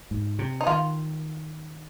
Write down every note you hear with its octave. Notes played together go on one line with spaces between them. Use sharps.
G#2
C3
D#4
D#3 F4